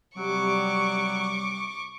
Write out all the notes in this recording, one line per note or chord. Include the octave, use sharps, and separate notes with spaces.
C3 F#3 G3 C#6 D6